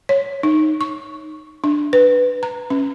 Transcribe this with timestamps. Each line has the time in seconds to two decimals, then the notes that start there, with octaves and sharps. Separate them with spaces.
0.09 C#5
0.43 D#4
0.81 C#6
1.64 D4
1.93 B4
2.43 A#5
2.70 C#4